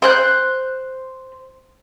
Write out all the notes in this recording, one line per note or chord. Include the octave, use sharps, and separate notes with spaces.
C5 F#6 G6